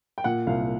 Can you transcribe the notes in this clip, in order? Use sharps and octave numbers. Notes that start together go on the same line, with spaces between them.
G5
A#2 F#5
C2 F5